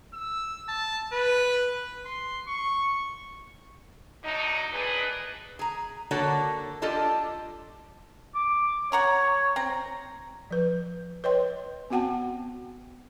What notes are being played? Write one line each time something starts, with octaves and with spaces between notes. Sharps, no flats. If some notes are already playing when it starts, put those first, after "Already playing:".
E6
A5
B4
C6
C#6
D3 F#3 A3 D#4
A#2 D4 D#4 G#4 B4
G#4 A#5
D3 A#3 F#4 A4 C#5
D4 F4 G4 A4 D#5
D6
C#5 F#5 A#5 C#6
C4 A#5
F3 B4
B4 C#5 D#5 G5 C6
B3 C4 F#4 F#5 G5 A5